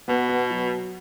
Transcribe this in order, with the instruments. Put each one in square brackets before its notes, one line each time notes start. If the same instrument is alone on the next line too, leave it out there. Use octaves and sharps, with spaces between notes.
[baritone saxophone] B2 [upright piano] B3
[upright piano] B3
F#3